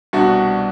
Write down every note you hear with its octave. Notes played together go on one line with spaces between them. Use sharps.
C2 B2 D4 F#4